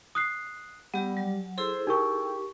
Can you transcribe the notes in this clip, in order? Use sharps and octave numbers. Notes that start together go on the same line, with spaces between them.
D#6 F#6 C7
G3 B3 G4 F#5
F#3
E4 G#4 A4 C5
D#4 G4 A#4 C#6